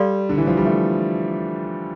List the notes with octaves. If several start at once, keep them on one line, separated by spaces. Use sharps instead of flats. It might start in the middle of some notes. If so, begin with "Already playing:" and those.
Already playing: G3 A4 D5 F5 C6
D3
E3
F3
G3
A3